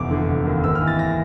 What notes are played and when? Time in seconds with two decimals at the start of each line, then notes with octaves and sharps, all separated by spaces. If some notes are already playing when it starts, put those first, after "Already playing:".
Already playing: F1 E2 D6
0.11 D3
0.28 F1
0.45 D#2
0.64 G#1 E6
0.75 F6
0.81 E3
0.87 A6
0.99 A#6